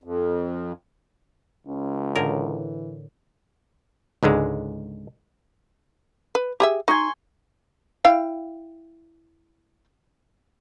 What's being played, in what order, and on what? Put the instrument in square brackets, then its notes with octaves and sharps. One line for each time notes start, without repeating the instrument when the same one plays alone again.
[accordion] F2
[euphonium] C#2 [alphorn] C#4
[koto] A2 D3 A#4 [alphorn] E3
[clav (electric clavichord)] C#2 G#2 D3 G#3
[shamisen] B4
G4 G#4 E5
[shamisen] D#4 [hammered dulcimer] G#5 C6 C#6
[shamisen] E4 F5 G5